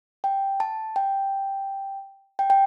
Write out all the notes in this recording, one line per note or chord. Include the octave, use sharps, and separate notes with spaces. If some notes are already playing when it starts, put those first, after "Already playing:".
G5
A5
G5
G5
G5